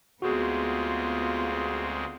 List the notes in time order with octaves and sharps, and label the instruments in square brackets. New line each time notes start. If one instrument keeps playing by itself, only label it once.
[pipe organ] D2 G#3 C4 [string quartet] B3 F4 [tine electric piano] F#4 G#4